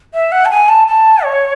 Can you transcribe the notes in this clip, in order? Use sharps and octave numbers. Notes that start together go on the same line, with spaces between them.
E5
F#5
A5
G#5
A5
A5
C#5